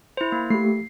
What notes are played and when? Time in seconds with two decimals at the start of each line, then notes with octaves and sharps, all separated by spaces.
0.17 E4 C5
0.32 A#3
0.50 A3 G4 C7